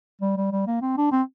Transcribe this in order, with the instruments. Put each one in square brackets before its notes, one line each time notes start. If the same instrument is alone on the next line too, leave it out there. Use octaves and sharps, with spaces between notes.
[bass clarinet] G3
G3
G3
A#3
C4
D4
C4